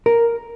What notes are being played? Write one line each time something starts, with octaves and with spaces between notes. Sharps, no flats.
A#4